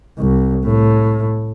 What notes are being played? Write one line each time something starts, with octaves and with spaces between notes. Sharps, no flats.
C2
A2